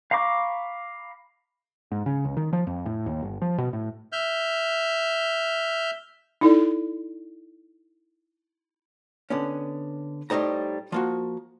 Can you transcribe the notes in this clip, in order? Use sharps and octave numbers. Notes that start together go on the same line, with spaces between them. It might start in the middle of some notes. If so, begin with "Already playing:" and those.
F5 A#5 B5 C#6 D6
G#2
C#3
C#2
D#3
F3
F2
A2
D#2
G1
F3
B2
A2
E5 F6 G6
D#4 E4 A4 D5
D3 B3 C#4
A2 G3 D#4 C5 A#5
F3 A#3 F#4